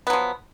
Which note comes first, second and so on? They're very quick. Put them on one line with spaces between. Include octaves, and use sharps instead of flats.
B3 F#3 F3